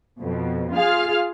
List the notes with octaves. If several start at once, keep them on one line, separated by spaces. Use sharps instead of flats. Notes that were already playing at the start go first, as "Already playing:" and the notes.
F2 B2
F4 G#4 F5 F6